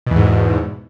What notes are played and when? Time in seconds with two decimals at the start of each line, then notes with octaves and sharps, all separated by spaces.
0.06 B2
0.11 E2
0.16 G#2